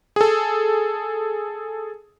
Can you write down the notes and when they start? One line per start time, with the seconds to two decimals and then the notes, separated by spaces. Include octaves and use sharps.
0.16 G#4 A4